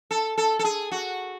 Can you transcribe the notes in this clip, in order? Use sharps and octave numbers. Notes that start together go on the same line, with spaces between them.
A4
A4
A4
G#4
F#4